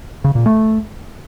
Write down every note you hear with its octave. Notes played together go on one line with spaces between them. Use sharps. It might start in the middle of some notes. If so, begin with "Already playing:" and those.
C#3
A#2
A3